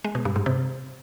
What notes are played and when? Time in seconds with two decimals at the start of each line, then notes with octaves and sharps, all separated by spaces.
0.04 G#3
0.15 B2
0.25 G2
0.36 G#2
0.46 C3